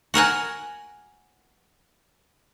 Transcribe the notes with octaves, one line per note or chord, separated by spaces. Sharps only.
F#4 A#4 F#5 G#5